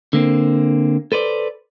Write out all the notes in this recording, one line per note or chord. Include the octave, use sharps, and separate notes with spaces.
D3 A#3 C4
A4 B4 C5 D5